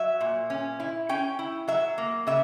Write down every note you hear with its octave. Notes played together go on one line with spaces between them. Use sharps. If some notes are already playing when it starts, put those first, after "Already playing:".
Already playing: F#3 E5
A#2
C#4
E4
C#4 G5
E4
F#3 E5
A#3
C#3 E5